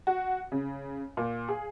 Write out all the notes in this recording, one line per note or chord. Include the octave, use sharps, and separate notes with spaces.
F#4
C#3
A#2
G#4